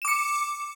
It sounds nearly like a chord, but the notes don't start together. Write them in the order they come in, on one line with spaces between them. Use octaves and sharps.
E7 D6 C#7